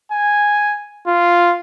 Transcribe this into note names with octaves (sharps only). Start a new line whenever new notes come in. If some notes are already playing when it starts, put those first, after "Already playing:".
G#5
F4